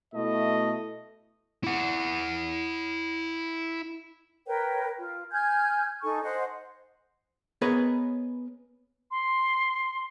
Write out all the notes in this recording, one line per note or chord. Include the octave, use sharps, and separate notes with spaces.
B2 A3 E4 D#5
E4 F#5
A#4 B4 C#5 G5
F4
G#5 F6 G6 G#6
D#4 A4 G#5 C#6
C5 D#5 F#5 G#5
B3 G#4 A#4 B4 C#5 D#5
C6